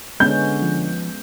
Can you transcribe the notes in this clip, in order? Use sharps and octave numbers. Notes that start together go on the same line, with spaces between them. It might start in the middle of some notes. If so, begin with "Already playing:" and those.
D3 G#3 B3 C#4 G6
F3